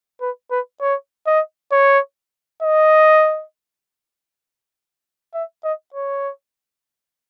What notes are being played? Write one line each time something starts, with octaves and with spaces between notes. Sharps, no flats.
B4
B4
C#5
D#5
C#5
D#5
E5
D#5
C#5